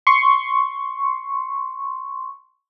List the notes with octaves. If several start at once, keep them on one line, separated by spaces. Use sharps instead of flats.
C6 C#6